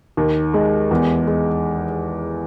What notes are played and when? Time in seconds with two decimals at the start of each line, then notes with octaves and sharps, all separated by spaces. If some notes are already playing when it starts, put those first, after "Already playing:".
0.17 D#2
0.54 G#3
0.91 E2
1.27 G#3